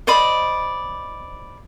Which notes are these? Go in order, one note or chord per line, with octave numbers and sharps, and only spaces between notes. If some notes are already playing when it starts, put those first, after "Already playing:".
C5 D5 D#5 B5